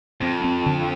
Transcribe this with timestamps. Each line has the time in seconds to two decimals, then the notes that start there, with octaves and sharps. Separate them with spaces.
0.21 F2 C4
0.44 C4
0.66 D3